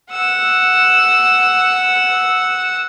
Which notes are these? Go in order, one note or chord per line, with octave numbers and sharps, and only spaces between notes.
F#5 E6